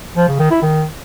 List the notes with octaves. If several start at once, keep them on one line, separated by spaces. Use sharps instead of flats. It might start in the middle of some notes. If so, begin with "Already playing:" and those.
F3
C#3
D#3
E4
D#3